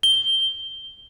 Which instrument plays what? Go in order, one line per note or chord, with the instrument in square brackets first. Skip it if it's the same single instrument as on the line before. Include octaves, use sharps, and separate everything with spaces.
[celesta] G7